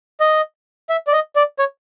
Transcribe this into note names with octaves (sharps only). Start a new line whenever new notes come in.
D#5
E5
D5
D#5
D5
C#5